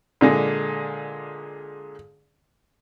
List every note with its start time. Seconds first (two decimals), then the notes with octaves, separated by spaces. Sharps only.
0.21 A#2 D3 G#3